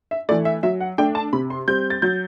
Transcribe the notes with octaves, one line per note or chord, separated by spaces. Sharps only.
E5
E3 A3 D5
E5
F#3 E5
F#5
A3 D4 G5
A5
C3 B5
C6
G3 C4 G6
A6
F#3 G6